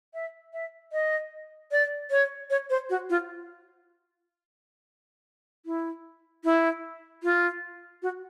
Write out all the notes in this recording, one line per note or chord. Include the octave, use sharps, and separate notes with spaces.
E5
E5
D#5
D5
C#5
C#5
C5
F#4
F4
E4
E4
F4
F#4